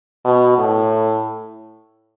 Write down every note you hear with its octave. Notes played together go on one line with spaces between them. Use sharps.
B2
A2